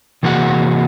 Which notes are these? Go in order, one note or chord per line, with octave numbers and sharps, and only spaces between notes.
C3 E3 A#3 F#4 G#4 F#5